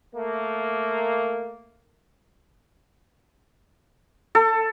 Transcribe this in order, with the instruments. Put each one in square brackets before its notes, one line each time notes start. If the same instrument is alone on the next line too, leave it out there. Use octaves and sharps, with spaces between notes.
[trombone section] A3 A#3
[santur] A4